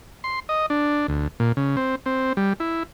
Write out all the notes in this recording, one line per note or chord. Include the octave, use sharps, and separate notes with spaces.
C6
D#5
D4
D2
A#2
C#3
C4
C4
G3
E4